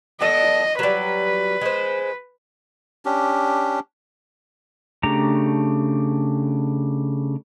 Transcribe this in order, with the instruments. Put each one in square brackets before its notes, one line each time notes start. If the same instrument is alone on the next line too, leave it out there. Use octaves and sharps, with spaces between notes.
[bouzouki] B3 A4 D5 [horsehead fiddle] D#5
[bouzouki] F#3 G3 [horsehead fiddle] B4
[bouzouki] G#3 C5
[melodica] C#4 D4 G4
[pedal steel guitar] C#3 A3 D4 G4 A#5